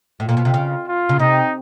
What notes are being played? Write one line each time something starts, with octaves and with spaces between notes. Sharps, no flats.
A2 F4
A#2
B2
C3
C#3
F4
C#3
C3 D#4